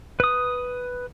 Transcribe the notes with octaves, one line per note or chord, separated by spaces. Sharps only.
B4 D#6